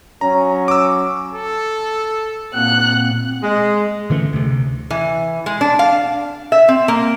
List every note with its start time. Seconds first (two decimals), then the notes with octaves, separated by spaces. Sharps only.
0.21 F#3 C#4 A#5
0.68 D6 E6
1.34 A4
2.54 A#2 A#3 C4 F#5 F#6
3.43 G#3
4.10 D3 E3 A3 C#4
4.33 D2 C3
4.90 E3
5.46 G#3
5.61 D4
5.79 F5
6.52 E5
6.68 C4
6.88 A#3